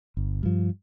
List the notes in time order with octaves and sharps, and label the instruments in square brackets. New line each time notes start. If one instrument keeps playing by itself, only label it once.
[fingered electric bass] G1
G2 F3